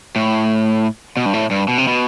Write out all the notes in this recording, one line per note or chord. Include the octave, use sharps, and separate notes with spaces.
A2
B2
G2
A2
G2
B2
C3
B2